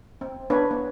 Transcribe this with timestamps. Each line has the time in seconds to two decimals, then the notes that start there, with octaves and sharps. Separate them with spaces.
0.21 C4
0.50 B3 D4 B4 C#5
0.71 B3